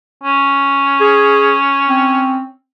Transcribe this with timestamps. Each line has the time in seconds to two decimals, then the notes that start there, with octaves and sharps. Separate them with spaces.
0.24 C#4
1.00 G#4
1.88 C4